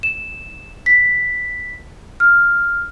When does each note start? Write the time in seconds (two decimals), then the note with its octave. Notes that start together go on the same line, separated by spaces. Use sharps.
0.03 E7
0.86 B6
2.20 F6